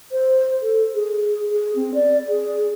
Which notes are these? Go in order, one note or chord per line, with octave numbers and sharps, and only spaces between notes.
C5
A4
G#4
G#4
C4
D5
G#4